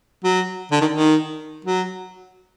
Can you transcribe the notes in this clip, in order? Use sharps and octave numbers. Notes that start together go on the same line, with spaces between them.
F#3
D3
D#3
D#3
F#3